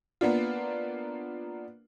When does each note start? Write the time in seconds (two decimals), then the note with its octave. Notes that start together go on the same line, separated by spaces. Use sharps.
0.21 A#3 B3 D4 F4